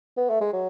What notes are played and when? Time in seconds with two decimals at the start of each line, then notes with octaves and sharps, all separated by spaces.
0.17 B3
0.30 A3
0.41 G#3
0.53 F#3